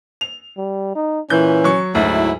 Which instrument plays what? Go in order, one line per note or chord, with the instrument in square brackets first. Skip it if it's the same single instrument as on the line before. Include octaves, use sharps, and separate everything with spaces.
[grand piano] F7
[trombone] G3
D#4
[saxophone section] A#2 E3 [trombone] C#4 [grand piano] G6
[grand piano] F#3 C#6
[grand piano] D2 [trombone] G#2 [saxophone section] F#3 E4